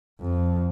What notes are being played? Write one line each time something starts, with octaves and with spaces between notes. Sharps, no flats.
F2